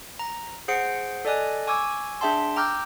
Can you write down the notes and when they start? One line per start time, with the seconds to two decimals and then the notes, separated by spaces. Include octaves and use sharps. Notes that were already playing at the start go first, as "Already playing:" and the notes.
0.19 A#5
0.68 G#4 C5 F#5 C7 D7
1.25 A4 D5 D#5 G#5 F#6
1.67 G#5 C#6 D6 E6 G#6
2.21 D4 G#4 E5 G5 A5 C6
2.56 G5 A#5 D6 E6 F6 G6